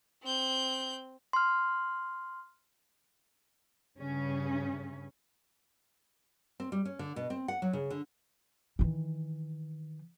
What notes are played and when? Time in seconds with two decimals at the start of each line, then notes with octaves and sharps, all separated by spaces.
0.23 C4 G6
1.33 C6 F6
3.98 G2 C#3 C#4
6.60 C4
6.72 G3
6.85 C#4
6.99 D3
7.16 B2
7.30 C4
7.48 F#5
7.62 F#3
7.73 C#3
7.90 D3
8.79 D#3 E3